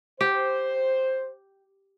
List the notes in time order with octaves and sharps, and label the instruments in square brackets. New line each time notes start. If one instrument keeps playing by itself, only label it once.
[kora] G4 [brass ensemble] C5